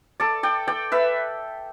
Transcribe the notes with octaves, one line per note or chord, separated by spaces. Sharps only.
A4 D5
D5 G5
D5 G5
B4 E5